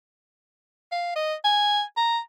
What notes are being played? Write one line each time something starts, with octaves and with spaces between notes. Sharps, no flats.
F5
D#5
G#5
A#5